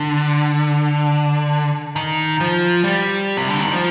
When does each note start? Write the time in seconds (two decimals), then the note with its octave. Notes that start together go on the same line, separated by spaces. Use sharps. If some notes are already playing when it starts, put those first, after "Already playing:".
Already playing: D3
1.96 D#3
2.40 F3
2.84 G3
3.37 C3
3.49 D3
3.61 D#3
3.73 F3